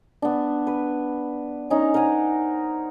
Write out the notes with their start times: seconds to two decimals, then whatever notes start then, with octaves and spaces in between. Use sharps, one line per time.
0.22 B3 D4
0.67 B4
1.70 C#4 D#4 A#4
1.94 A#4 C5 F#5 G#5